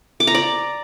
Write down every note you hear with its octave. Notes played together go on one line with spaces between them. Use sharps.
D6
A#5
D5